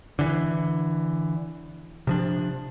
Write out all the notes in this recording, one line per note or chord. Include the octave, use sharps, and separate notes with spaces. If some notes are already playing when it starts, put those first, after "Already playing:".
D3 E3
C3 F3 D4